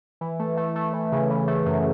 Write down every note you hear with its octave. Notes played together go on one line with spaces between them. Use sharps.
E3
A3
A3
A3
E3
C#3
E3
A3
F#2